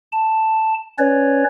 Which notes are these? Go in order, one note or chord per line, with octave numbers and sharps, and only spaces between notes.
A5
C#4 B4 C#5 D5